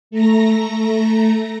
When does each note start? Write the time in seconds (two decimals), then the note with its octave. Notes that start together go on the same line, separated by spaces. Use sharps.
0.11 A3 A#5 A#6